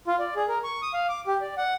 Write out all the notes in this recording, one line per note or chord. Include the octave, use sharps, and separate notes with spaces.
F4
D5
G#4
A#4
C#6
D#6
F5
D6
G4
D5
F#5